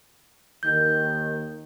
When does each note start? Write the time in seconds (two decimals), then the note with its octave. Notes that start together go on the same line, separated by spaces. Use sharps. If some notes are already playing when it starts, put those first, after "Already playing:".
0.63 D#2 D#3 G6